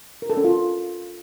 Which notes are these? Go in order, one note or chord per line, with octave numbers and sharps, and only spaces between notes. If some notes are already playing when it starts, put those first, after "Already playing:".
A#4
A4
C#4
F4